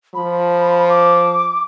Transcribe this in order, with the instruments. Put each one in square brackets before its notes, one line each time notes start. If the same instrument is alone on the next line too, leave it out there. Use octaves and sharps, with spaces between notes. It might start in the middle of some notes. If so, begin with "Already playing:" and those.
[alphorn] F3 [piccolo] B5
[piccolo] D6